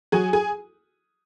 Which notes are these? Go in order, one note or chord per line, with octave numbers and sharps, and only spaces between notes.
F#3 G#4 G#5
G#4 G#5